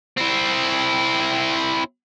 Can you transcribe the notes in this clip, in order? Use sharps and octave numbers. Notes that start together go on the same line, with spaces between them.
C4 E4